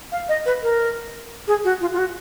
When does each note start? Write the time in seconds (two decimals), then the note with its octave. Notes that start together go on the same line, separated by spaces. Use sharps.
0.12 F5
0.29 D#5
0.46 B4
0.63 A#4
1.47 G#4
1.64 F#4
1.81 F4
1.93 F4
1.98 F#4